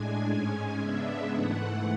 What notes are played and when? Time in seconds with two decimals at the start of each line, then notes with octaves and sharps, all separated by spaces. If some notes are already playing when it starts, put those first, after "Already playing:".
Already playing: A2 G#3 D4 G#5
0.28 G#2 G#3 C#4 G#5
0.78 C#3 G#3 B3 D4 E5
1.30 G#2 E3 A3 F#5